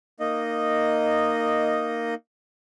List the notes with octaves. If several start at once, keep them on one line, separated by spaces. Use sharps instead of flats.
A#3 D#4 D#5